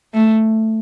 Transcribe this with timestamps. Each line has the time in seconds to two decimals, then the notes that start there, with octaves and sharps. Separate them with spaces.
0.14 A3